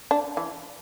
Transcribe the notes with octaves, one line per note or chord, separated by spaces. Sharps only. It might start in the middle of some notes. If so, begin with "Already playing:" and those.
D4
E3